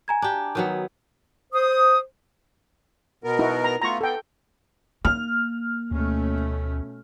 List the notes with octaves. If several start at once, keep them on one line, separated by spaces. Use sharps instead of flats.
G#5 A#5 G#6
D4 G4
D#3 F#3 B3
C5 D#6
B2 B3 A#4
D#4 E4 F#4
A#5
A3 B3 F4 A#5 C#6
B3 A4 G5
A#3 F6
D2 B2 A3 C#4